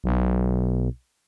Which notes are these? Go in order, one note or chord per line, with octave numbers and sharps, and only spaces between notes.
B1